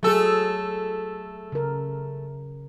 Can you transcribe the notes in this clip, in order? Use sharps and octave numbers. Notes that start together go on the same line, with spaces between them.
F#3 A3 G#4 A4
C#3 A#4